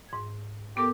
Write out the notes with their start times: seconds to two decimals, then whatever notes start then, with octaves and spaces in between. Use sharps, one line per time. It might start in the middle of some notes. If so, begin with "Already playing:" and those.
0.09 G#2 G#6
0.77 B3 G4 A4 A#4